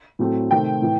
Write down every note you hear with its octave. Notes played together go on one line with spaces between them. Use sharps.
A2 F#3 A3 C4
C3 D#3 A3 C4 G5
A2 E3